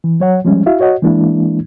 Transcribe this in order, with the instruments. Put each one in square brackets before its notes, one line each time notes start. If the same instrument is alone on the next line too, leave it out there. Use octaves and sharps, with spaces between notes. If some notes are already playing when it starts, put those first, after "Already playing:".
[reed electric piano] E3
F#3 C#5 F#5
F3 G3 G#3 C#4
E4 F#4 E5 F5
F#4 C#5 D#5 F#5
E3 G#3 A#3 D4 E4